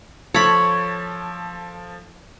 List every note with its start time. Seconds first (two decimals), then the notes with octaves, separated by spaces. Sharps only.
0.34 F3 A4 C#5 B5 G#6